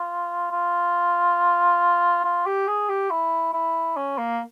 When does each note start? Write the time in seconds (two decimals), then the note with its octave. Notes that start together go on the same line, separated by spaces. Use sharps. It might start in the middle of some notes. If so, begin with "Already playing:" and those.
Already playing: F4
0.51 F4
2.24 F4
2.46 G4
2.67 G#4
2.89 G4
3.10 E4
3.53 E4
3.96 C#4
4.18 A#3